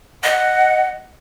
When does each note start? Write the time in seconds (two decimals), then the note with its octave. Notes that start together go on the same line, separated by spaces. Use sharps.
0.24 D#5 F#5